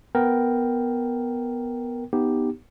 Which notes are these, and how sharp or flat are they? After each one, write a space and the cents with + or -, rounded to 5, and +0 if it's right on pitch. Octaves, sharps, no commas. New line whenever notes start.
B3 +0 A#4 +0 G5 +0
B3 +0 D#4 +0 G4 +0